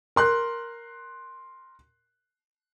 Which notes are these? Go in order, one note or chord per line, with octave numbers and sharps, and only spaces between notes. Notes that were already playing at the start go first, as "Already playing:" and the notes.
A#4 C6 F#6